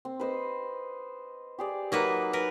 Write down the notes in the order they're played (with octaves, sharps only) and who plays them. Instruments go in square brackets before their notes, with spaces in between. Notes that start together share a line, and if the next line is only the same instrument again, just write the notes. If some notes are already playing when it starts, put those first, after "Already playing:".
[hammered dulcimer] C4
B4 C5 D#5
G4 G#4 D5
[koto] F#3 A#3 B4 [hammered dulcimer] D#4 D#5 F#5
[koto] A#4 B4